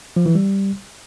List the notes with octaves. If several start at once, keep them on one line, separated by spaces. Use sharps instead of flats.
F3
E3
G3